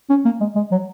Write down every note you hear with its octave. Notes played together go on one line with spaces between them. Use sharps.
C#4
A#3
G#3
G#3
F#3